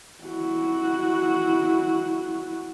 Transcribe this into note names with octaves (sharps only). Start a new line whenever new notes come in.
E4 F#4